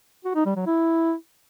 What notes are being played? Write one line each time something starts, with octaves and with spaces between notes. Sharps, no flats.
F#4
D#4
G3
F#3
E4